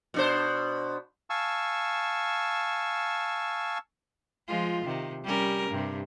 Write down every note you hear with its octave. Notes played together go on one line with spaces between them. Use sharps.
B2 D4 C5
F5 G#5 A5 C#6 E6
F3 G#3 F4
C3 D#3
G3 C#4 A#4
G2 C3